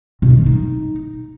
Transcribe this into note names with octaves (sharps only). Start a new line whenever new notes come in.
B2
D#3
F4
D#4